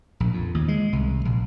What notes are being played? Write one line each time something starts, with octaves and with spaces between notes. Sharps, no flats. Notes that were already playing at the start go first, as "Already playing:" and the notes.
A#1
F2
D#2
G#3
C2
A#1